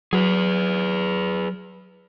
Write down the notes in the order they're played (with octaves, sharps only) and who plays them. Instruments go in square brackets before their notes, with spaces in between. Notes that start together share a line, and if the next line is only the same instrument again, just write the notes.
[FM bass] F#3 [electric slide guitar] G#4 B4